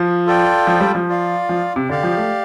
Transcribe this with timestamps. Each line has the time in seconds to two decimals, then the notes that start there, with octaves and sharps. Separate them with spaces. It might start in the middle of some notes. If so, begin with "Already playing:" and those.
Already playing: F3
0.26 F4 A4 D5 G5
0.67 F3
0.80 G3
0.95 F3
1.08 F4 D5 F5
1.49 F3
1.76 C3
1.89 D3 G4 D5 F5
2.03 F3
2.17 A3